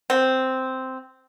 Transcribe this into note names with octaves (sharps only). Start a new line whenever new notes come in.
C4